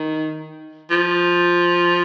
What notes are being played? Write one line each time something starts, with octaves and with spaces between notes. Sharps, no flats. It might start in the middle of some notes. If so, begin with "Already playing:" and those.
Already playing: D#3
F3